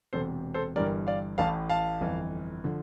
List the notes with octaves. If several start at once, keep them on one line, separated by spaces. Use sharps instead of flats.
E1 E2 C3 A4 C5
A4 C5
G1 G2 E3 G3 A#4 D5
D5 F5
A1 A2 E3 F5 A5
F5 A5
G1 F2 E3
D3 F3